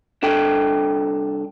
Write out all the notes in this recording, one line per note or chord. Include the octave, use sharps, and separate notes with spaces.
C2 D4 A4 G5